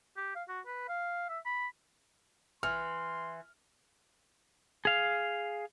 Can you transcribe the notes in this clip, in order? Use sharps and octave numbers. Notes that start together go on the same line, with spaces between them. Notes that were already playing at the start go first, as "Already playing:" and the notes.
G4
F5
F#4
B4
F5
E5
B5
E3 C6 F6
G#4 F5